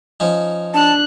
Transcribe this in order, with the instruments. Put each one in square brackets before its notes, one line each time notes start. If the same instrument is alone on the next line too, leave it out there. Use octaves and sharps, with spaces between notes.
[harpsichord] F3 C#4 D#4
[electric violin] D4 F#6 [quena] A5